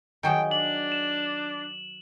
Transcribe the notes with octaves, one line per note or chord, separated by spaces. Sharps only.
D#3 F#3 G#4 G5
D4 F#7
E7